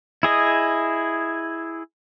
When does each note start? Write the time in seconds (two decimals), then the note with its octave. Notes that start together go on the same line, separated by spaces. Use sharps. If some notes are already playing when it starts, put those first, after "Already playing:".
0.23 E4 G#4 D#5